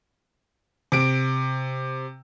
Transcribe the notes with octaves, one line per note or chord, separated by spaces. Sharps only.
C3 D7